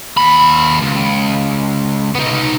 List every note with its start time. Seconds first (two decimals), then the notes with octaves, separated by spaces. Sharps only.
0.17 D#2 B5
0.81 C#2
2.15 B3 D#4